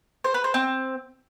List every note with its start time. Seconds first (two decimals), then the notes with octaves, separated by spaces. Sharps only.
0.24 C5
0.34 B4
0.44 C5
0.54 C4